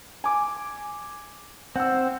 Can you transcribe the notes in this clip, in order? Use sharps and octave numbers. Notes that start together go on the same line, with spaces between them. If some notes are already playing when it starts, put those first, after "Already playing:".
G#5 D6
C4 F#5 E6